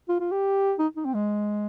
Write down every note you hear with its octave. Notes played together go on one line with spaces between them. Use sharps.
F4
F4
G4
D#4
D#4
C4
G#3